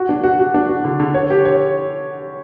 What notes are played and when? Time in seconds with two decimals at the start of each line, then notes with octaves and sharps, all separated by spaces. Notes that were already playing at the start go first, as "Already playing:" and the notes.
Already playing: F#4
0.09 D4
0.23 F#4
0.39 F#4
0.54 D4
0.69 F#4
0.85 D3
1.00 D3
1.14 C#5
1.30 G4
1.45 C#5